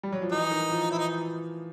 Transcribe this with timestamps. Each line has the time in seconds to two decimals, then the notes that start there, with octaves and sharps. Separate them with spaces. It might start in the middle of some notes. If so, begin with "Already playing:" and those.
0.03 G3
0.12 F#3
0.22 F3
0.31 E3 D#4
0.51 D#3
0.71 F3
0.91 E3 E4
0.99 D#4